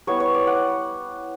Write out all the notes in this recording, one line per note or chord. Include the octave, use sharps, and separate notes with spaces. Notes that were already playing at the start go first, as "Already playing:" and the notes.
G3 B3 E4 C#5
C#5
D5
F#5